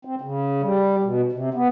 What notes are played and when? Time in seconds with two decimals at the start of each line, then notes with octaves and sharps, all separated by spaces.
0.05 C4
0.21 C#3
0.62 G3
1.03 B2
1.32 C3
1.54 B3